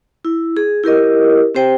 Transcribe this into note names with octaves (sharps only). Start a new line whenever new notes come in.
E4
G#4
E4 G4 A#4 D#5
C4 G4 C5 G5